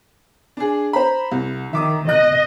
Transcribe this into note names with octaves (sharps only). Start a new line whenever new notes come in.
D4 G#4
C5 A#5 B5
C2
D#3 E5 D6 D#6
D#5 F#6